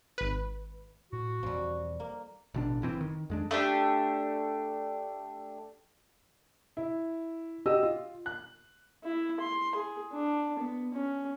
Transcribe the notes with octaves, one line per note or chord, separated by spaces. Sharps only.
G#1 B4
A2 F#4
E1 F3 G3 C4
A#3
A1 B2 D4
F#1 E3 C4
D#3
F2 G#3 D4
A3 D4 G4
E4
F#4 G4 D#5 E6
F4
F#6
E4
C6
G#4
D4
B3
C#4